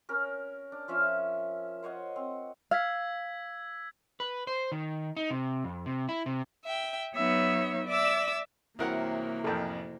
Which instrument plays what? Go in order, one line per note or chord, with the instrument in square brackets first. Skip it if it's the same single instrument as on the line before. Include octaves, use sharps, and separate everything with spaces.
[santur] C#4 A#4
D4
F3 C#4 E5
C5 C#5 D#5 F#5
C4
[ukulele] F5 [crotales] E6 G#6 B6
[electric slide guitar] B4
C5
D#3
D#4
C3
F2
C3
E4
C3
[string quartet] E5 G5
F#3 B3 D#4 C#5 E5
D5 E5 D6 E6
[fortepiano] C2 A#4 F#5 [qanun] C3 E3 F#3 [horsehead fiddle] A#3
[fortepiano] A1 F2 [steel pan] A4 A#4 G5